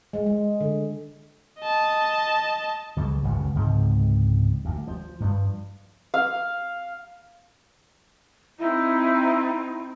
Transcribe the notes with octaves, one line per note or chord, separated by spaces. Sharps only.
G#3
G#3
D3
D#5 A5
C#2 F#3 G3
F#1 C#2 C#3
C#2 G#2 C3 F3
D2
F3
G2 F3
F5
C4 D#4 E4